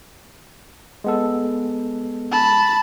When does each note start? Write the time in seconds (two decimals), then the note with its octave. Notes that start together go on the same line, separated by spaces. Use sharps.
1.04 G#3 B3 A4
2.31 A5 B5